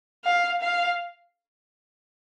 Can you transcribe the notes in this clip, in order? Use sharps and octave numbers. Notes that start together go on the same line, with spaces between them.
F5
F5